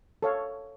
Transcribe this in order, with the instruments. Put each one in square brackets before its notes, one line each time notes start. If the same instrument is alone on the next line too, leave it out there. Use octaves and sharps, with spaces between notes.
[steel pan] A4 C#5 F5